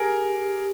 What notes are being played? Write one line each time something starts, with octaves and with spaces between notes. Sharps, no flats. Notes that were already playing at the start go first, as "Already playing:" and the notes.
Already playing: G4 G#4 A#4